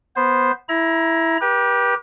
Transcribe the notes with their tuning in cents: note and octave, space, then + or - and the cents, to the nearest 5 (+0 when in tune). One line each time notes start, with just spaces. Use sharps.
B3 +0 C5 +0
E4 +0 A#5 +25
G4 +0 B4 -40